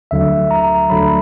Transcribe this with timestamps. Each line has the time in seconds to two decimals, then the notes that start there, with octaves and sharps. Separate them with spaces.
0.11 D2 D3 F#3 E5
0.51 A#5
0.90 D2 D3 F#3 B5